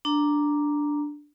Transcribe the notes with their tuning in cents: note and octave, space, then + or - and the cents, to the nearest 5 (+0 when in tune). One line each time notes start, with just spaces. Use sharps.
D4 +0 A#5 +0